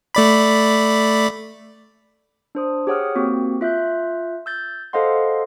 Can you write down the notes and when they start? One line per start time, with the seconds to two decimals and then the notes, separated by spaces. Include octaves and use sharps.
0.15 A3 D5 B5
2.55 D4 C5 D#6
2.87 G4 G#4 C#5 F#5 D#6 F6
3.15 A#3 C4 F#4 G4
3.61 F4 E5 F#6 G6
4.46 E6 G6 A6
4.93 A4 C5 D#5 F5 F#5 C6